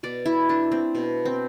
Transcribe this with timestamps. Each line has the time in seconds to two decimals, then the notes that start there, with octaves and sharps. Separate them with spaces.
0.03 B2 D5
0.26 E4
0.49 A3 D4
0.72 C4
0.95 B2
1.25 C4